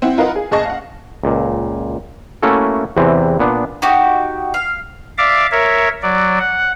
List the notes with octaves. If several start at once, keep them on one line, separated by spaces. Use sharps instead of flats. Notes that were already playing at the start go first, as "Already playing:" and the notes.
C4 E4 F#5
F4 A#4 B4 D#5 F5 F#5
G#4
F#1 G#4 D#5 A5 C#6 A#6
F5 F#5
C#2 A#2
A3 A#3 C#4 E4 F#4 A4
E2 C3 E3 C4
A#2 B3 D4
D#4 F#4 G4
F5
D5 E5 F5 D6
A#4 C#5 E5
F#3 D5
F#5